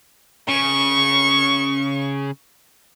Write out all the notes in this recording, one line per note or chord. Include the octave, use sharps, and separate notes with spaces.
C#3 C#6